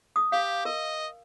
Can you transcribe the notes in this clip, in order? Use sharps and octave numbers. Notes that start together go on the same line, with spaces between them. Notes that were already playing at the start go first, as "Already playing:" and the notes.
D#6
G4 F5
A#4 D#5